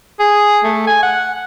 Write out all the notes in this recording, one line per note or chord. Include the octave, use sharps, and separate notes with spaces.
G#4
A3
G#5
F#5